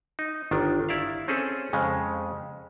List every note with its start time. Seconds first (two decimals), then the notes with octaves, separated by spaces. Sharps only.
0.19 D#4
0.51 G1 D#3 D4
0.89 E4 D5 E5 F5
1.28 C4 C#4 G#4 A4
1.73 F2 C#3 G#3